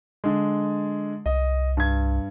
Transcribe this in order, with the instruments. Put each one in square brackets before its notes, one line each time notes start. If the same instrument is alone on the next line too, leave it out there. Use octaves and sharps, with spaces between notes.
[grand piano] D3 G#3
[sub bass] C2 [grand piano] D#5
[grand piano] G2 G#6